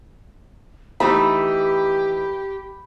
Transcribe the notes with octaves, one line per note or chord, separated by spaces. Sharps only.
E3 A3 D#4 G4 B5